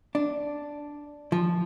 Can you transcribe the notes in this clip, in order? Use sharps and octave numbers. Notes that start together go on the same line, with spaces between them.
D4
F3